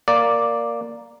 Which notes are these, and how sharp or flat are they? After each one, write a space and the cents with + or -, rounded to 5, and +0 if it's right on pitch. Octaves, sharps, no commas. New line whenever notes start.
A#3 +0 D5 +0